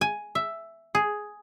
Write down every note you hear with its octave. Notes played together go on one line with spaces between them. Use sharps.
G#5
E5
G#4